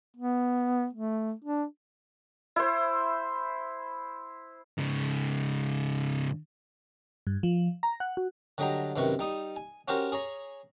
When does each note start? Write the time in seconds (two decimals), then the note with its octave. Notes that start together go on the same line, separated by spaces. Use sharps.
0.16 B3
0.93 A3
1.44 D4
2.56 E4 C5
4.78 G#2 C#3
7.27 G2
7.43 F3
7.83 A#5
8.00 F#5
8.17 F#4
8.58 D3 F#3 G3 D#5 G5 A#5
8.96 F#2 C3 D#3 B4 C#6
9.19 G3 D#4 D#6
9.56 G#5
9.88 C#4 F#4 G4 A#4 C5
10.12 G#4 C#5 A#5